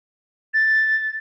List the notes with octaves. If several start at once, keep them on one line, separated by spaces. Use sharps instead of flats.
A6